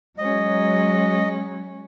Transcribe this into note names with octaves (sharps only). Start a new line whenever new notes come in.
F#3 G#3 C#4 D#5